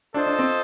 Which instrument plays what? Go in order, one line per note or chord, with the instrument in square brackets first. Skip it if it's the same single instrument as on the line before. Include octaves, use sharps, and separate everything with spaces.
[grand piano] D4 [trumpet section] F4 A4 C5 D#5
[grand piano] D4
C4